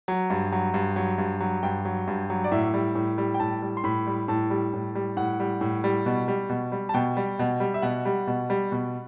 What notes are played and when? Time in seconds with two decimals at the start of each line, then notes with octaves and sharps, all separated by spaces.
0.08 F#3
0.30 G2
0.52 F#3
0.74 G2
0.96 F#3
1.18 G2
1.40 F#3
1.63 G2 G5
1.85 F#3
2.08 G2
2.30 F#3
2.44 D5
2.51 A2 E5
2.74 G3
2.95 A2
3.18 G3
3.34 G5
3.40 A2 A5
3.62 G3
3.77 C6
3.84 A2 B5
4.07 G3
4.28 A2 A5
4.50 G3
4.73 A2
4.95 G3
5.17 A2 F#5
5.40 G3
5.61 A2
5.84 G3
6.06 B2
6.28 G3
6.49 B2
6.72 G3
6.89 A5
6.94 B2 G5
7.17 G3
7.39 B2
7.60 G3
7.74 E5
7.82 B2 F#5
8.05 G3
8.27 B2
8.50 G3
8.72 B2